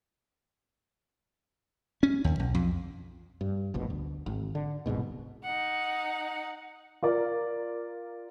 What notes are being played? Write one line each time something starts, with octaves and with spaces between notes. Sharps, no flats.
C#4
D#2
B1
F2
G2
F1 A#1 B2
D2
G#1
D3
D#1 C2 G#2 B2
D#4 F#5
F4 A#4 D5